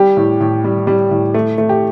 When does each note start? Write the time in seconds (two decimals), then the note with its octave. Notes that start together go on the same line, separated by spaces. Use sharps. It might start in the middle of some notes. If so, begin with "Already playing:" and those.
Already playing: G3 G4
0.17 A2
0.40 A2
0.64 G3
0.87 G3
1.11 A2
1.34 A3
1.58 A3
1.69 G4